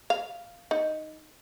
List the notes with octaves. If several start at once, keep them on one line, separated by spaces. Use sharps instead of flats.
F5
D#4